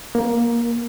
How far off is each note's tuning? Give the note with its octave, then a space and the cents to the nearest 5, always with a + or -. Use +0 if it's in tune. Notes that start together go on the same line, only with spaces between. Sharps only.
A#3 +15